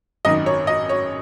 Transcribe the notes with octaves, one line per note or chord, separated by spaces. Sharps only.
G#1 F#2 D#3 D#5
C#5
D#5
C#5